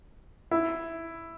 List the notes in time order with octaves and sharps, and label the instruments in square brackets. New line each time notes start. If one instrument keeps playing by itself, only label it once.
[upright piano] E4